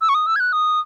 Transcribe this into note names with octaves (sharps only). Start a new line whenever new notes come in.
E6
C#6
D#6
E6
G#6
F#6
D#6